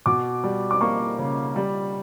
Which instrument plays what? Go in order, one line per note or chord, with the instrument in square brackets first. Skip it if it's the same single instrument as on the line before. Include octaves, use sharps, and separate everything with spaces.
[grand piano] B2 [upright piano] D6
[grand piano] G3
[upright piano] D6
[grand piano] A#3 [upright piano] C#6
[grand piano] C#3
G3